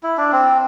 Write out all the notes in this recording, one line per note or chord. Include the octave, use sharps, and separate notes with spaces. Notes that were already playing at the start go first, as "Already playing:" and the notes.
E4
D4
C4